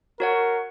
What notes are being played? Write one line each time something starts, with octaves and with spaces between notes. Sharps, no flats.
F#4 A#4 C#5 F#5